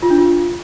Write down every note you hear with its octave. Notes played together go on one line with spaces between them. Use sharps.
F4
D4
F4